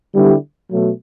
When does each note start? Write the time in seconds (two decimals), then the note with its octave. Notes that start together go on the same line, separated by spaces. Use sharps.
0.15 D3 G3 B3 E4 G4
0.70 B2 F#3 A3